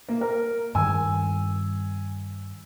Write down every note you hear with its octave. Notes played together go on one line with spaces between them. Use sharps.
A#3
A#4
G2 D#3 G#5 E6